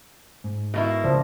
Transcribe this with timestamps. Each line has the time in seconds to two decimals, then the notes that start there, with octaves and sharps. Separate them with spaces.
0.44 G#2
0.74 B2 A#3 E4
1.04 C#3 F3 D5